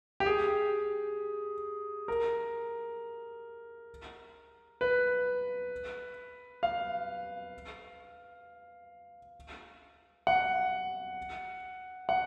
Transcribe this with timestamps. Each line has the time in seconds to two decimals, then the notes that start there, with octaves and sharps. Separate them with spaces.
0.20 G4
0.26 G#4
2.08 A#4
4.81 B4
6.63 F5
10.27 F#5
12.09 F#5